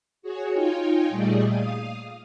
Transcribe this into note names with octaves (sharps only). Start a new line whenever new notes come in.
F#4 G#4 C#5
D#4 F4 C#5 G5 G#5
A#2 G3 A3 G#4 D5 D#5
F5 D#6